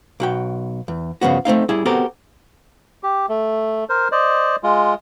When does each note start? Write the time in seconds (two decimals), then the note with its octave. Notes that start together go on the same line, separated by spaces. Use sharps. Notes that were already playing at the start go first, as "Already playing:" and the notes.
0.20 B1 F#4 G5
0.88 E2
1.21 G2 C#3 F3 B3 F#4
1.45 A3 C4 D#4 F5
1.69 G3 E4 G#4
1.85 B3 C4 F#4 G4 A4 A#4
3.03 G4
3.29 A3
3.89 A#4 C5
4.12 C5 D5 D#5
4.63 G#3 F4